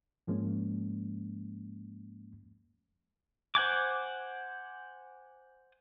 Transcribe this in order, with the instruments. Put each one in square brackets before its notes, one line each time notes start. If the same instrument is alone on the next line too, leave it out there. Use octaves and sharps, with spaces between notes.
[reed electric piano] G#2 F3 G#3 A#3 C#4
[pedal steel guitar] C5 F#5 G#5 D6